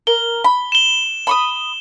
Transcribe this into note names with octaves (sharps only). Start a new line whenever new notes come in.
A#4 G7
B5
E7 G7
B5 C#6 D#6